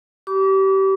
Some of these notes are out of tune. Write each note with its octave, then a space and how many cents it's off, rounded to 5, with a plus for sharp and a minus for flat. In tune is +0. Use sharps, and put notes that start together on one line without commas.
G4 -25 B5 +0 D6 -35